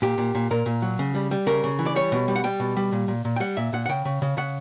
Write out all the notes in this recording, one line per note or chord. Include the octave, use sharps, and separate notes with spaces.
A#2 G4
A#2
A#2
A#2 A#4
A#2
F#3
C#3
G3
G3
C#3 A#4
C#3
E3
D5
G3 C#5
B2
G3
F#5
G3 G5
B2
G3
A#2
A#2
A#2
G5
G3 F#5
A#2 E5
A#2 F#5
F#5
C#3 G5
C#3
C#3
C#3 F#5